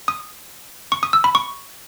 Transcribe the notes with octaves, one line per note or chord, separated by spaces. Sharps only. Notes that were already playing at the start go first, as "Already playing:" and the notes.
D#6
C#6
D#6
E6
B5
C#6